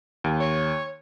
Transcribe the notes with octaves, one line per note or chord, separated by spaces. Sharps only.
D#2
C#5